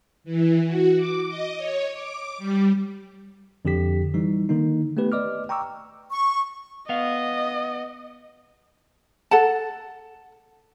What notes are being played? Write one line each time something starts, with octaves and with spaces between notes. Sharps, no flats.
E3
F#4
D6
D#5
C#5
D6
G3
F2 D3 F3 G4 B6
E3 G3 D#4
D3 D#3 A#3 D#4
A3 B3 G4 B4
B4 D5 D#5 D6 F6
G5 A#5 C#6 D6 E6
C#6
B3 D#5 F5
A4 F#5 A5